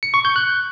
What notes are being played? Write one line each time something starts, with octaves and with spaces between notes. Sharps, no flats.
C#7
C#6
G6
F#6